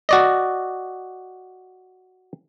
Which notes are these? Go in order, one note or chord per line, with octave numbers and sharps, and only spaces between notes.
F#4 D5 D#5